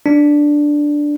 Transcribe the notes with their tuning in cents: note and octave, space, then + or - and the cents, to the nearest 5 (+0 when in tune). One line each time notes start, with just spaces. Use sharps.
D4 +0